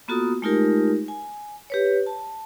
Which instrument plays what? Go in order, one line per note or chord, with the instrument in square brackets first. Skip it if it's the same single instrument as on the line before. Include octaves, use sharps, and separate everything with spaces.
[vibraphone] A#3 B3 F4 F#4 A4 D#6
G#3 A3 D#4 F4 G4 A#4
G#5
G4 B4 C#5
A5